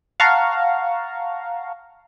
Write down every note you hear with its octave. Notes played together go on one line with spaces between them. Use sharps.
F5 F#5 A5 A#5 C#6